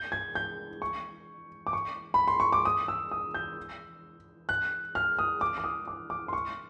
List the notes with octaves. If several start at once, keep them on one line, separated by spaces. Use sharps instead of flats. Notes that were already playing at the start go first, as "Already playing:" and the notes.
Already playing: G6
G#6
G6
C#6
D6
C#6
B5
C6
C#6
D6
D#6
E6
D#6
G6
F#6
F6
D#6
D6
D6
D#6
D6
D6
C6
C#6